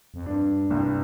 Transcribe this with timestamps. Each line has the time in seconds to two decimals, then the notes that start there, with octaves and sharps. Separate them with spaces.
0.14 F2
0.26 G2 D4
0.69 C2 G2